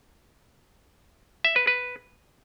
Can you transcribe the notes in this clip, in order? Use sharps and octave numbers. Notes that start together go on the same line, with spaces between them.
E5
B4
B4